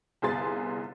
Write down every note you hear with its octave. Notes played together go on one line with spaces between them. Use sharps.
G1 C2 G#4 C6 A6